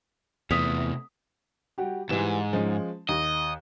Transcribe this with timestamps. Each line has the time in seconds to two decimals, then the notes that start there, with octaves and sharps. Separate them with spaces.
0.51 E2 C3 A3 D#6 B6 F7
1.78 G3 F#4 G4
2.09 E2 G#2 E3 G3 E7
2.53 F3 G#3 C#4
3.09 D#2 D#5